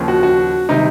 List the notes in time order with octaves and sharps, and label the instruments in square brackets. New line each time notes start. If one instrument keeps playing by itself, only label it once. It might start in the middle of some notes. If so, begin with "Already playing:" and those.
Already playing: [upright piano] D#2 C#3 F3
F#4
F#4
C3 D#3 G3 D#4